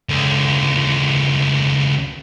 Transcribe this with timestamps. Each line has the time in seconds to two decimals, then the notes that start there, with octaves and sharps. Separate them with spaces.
0.09 C#2 D3